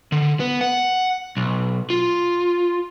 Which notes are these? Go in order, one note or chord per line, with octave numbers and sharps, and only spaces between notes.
D3
B3
F#5
B1
F4